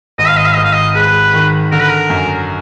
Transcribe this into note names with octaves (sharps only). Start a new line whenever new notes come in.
G#1 D#5
F5
D#5
F5
G#1 D#5
F5
D#5
G#3 B4
D#3
D3 A#4
B4
A#4
F#2